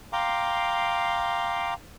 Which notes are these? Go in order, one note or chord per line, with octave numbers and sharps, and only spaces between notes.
F5 G5 A#5 C6 D6